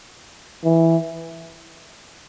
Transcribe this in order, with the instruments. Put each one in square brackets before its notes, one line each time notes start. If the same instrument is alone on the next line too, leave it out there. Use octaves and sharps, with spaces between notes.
[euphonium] E3